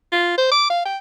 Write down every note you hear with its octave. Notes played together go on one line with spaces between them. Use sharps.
F4
C5
D6
F5
G5